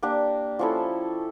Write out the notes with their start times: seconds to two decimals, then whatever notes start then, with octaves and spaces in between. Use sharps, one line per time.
0.03 A#3 D4 G4
0.59 F3 C#4 E4 A4